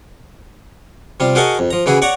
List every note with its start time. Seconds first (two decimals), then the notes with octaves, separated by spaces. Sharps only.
1.20 C3 G3 F4
1.35 F#4 G#4 A#4 D#5 A5 C#6
1.59 F2
1.71 F3 A#5
1.86 C#3 E3 E4 F#4 G#4
2.02 C#5 D5 F#5 A#5 C#6